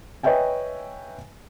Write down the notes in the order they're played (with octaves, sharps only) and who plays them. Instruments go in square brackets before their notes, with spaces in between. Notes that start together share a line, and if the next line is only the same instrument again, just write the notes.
[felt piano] B4 C#5 D#5 E5 G5 G#5